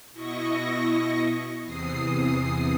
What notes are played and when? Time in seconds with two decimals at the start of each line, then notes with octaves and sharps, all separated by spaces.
0.12 B2 E4 D#5 C#6 A#6
1.64 E2 C3 E3 D#6 C7